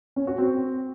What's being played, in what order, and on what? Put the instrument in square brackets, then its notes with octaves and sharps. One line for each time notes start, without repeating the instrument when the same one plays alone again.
[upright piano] C#4
F#4
C4